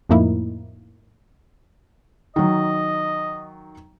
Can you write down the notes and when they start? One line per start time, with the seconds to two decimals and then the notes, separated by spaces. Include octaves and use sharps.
0.09 F2 A2 F3 A#3 D#4 E4
2.36 D#3 F#3 D#5